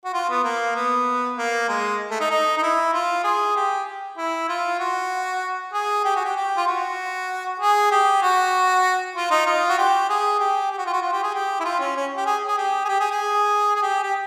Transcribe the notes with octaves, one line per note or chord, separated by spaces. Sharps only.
F#4
F4
B3
A#3
B3
A#3
G#3
A3
D#4
D#4
D#4
E4
F4
G#4
G4
E4
F4
F#4
G#4
G4
F#4
G4
G4
F4
F#4
G#4
G4
F#4
F4
D#4
F4
F#4
G4
G#4
G4
G4
F#4
F4
F#4
F4
G4
G#4
G4
E4
F4
C#4
C#4
G4
G#4
G#4
G4
G#4
G4
G#4
G#4
G#4
G4
G4